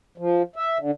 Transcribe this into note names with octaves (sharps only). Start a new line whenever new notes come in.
F3
E5
D3